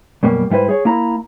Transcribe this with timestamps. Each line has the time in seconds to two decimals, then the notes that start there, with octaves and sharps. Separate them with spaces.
0.23 F#2 B2 G3 A#3
0.50 G#2 G3 E4 B4 C5
0.69 G#4 C#5
0.85 A#3 E4 A#5